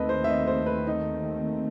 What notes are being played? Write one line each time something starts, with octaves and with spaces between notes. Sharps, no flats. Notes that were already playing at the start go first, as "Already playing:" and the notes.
Already playing: D#2 D#3 A3 C4 A4 B4 D#5
C5
E5
D#5
C5
B4
D#4